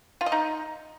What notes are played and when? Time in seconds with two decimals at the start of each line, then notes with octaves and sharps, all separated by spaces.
0.21 F4
0.26 D#5
0.32 D#4